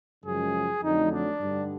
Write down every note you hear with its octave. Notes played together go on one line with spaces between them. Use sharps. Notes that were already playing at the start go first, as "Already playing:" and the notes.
F#2 C#3 F3 G#3 G#4
F2 D3 F#3 A3 D#4
D4
G2 D3 G3